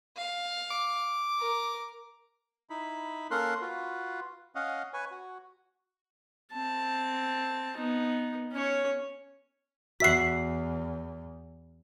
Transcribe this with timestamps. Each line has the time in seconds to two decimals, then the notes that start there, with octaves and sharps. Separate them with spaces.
0.17 F5
0.71 D6
1.39 A#4
2.70 D#4 E4 B5
3.31 A#3 C#4 A4 A#4 C6 F#6
3.61 F4 F#4 B4
4.55 C#4 D#5 F5 F#5
4.93 B4 C#5 G#5
5.11 F#4
6.53 C4 A5
7.78 B3 D#4
8.52 C#4 C#5
10.00 E2 F#4 E5 F#5 B6 C7